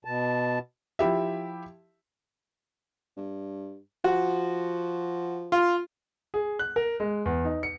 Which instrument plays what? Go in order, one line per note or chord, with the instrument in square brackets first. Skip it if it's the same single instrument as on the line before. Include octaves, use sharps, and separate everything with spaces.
[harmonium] B2 A5
[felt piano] F3 E4 G4 E5
[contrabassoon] G2
[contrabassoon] F3 [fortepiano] F#4
[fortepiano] F4
[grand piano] G#4
F#6
A#4
G#3
E2
D#4
C#7